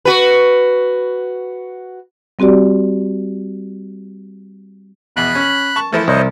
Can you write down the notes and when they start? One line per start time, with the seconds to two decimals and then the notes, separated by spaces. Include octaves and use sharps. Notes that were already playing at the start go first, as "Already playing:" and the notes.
0.05 F#4 B4
2.39 G3 C4 F#4 G4 D5
5.17 E2 B2 B5 F#6
5.35 C#4
5.76 A5 C#6
5.93 E3 F3 A3 E4
6.08 C2 C5 C#5 D#5